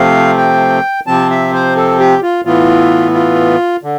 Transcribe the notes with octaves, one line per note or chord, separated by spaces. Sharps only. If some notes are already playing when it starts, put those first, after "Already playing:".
Already playing: C3 F3 A3 C4 F5
G5
C3 F3 C4 A5
E5
C5
A4
G4
F4
A2 E3 B3 F4
F4
D3